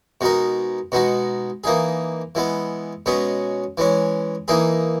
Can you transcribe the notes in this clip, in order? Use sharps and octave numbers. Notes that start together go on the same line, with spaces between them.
B2 G#3 D#4 A#4
B2 G#3 D#4 F#4
E3 A#3 D#4 G#4
E3 G#3 B3
B2 G#3 C#4 G#4
E3 G#3 C#4
E3 A#3 D#4 G#4